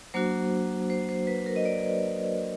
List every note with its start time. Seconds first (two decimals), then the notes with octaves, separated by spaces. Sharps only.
0.14 F#3 A#3 D4 F#4 C5
0.90 C5
1.09 C5
1.27 B4
1.46 A#4
1.56 D#5
1.65 D5